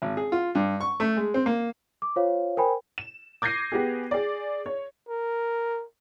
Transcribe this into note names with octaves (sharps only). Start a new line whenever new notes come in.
G#1
G#4
F4
G2
C#6
A3
G#3
C4
A#3
D6
F4 C5 C#5 F5
A#4 C5 G5 G#5 B5
E7
D6 G6 G#6 A#6 C7 D#7
B3 G4 G#4
G#4 D5
C#5
A#4